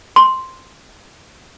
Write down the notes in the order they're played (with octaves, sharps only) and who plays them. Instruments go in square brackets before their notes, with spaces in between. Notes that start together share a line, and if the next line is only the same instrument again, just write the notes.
[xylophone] C6